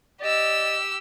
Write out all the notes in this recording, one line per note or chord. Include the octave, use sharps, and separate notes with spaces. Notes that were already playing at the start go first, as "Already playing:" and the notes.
G4 D5 D#5 E6